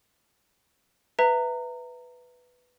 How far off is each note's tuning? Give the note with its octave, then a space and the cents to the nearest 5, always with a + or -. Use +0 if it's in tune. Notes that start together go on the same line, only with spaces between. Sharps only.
B4 +5 E5 +5 A#5 -25